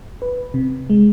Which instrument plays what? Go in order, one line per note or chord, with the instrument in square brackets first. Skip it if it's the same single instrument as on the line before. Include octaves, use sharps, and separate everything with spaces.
[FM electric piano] B4
C3
G#3